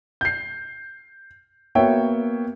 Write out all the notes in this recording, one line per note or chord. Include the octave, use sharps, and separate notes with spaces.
G6 C7
A#3 B3 F#4 C#5 E5 G5